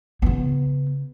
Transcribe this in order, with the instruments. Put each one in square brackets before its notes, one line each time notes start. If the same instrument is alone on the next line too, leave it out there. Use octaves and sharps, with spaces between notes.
[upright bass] C#3 B3